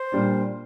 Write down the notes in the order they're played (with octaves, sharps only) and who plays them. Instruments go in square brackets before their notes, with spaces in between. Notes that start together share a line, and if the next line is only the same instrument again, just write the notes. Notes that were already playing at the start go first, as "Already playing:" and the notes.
Already playing: [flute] C5
[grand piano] A#2 G3 D4